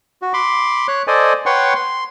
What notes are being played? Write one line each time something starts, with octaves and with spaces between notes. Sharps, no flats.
F#4
B5 C6 D6
C#5 F#6
A4 C5 D5 D#5 G#5
B4 C#5 F#5 G5 C6 C#6
C6